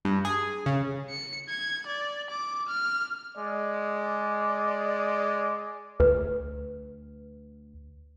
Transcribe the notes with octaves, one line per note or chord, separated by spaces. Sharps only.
G2
G#4
C#3
C#7
G#6
D5
D6
F6
G#3 D5
D2 B4